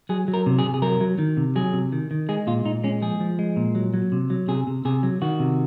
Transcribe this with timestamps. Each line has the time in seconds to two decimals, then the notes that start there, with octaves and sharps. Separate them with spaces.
0.09 F#3 G#4
0.28 F#3
0.34 A#4
0.46 C3
0.59 G#4
0.64 C3
0.74 G#4
0.82 F#3 A#4
1.01 F#3
1.19 D#3
1.37 C3
1.56 F#3 G#4
1.73 C3
1.92 D#3
2.11 D#3
2.29 G#3 G#4
2.47 A#2 F4
2.65 A#2 D#4
2.84 G#3 C#4
3.02 F3 G#4
3.20 F3
3.39 G#3
3.56 A#2
3.75 F#3
3.94 F#3
4.12 C3
4.30 F#3
4.48 C3 G#4
4.67 C3
4.85 C3 G#4
5.03 F#3
5.22 D#3 F#4
5.40 C3